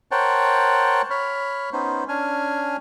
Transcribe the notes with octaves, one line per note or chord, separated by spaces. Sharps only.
A#4 C5 C#5 F#5 G5 A5
C#5 B5 F6
B3 C#4 D#4 C5
C#4 D4 G#5 F6